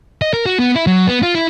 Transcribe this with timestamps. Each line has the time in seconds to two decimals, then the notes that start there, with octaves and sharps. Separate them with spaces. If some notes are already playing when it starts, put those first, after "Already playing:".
0.22 D#5
0.33 A#4
0.46 F#4
0.59 B3
0.75 E4
0.87 F#3
1.08 B3
1.23 F4
1.35 E4